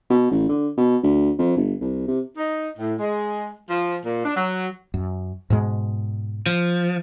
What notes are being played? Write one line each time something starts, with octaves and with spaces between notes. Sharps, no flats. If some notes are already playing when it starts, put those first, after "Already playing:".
B2
A1
D3
B2
D2
F2
G1
C2
C3
D#4
A2
G#3
F3
A#2
D4
F#3
F#2
G#2 B2 G#3
F3